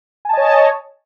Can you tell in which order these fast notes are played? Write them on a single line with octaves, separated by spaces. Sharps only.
G#5 A5 D#5 C#5